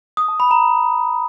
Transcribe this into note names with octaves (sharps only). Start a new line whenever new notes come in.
D#6
A5
B5
A#5